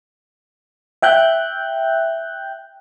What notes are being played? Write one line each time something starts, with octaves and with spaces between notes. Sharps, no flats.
E5 G5 F#6 G6